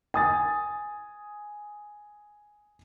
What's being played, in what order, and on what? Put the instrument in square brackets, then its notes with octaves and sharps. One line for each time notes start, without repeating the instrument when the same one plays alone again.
[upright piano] G#5 D#6 A6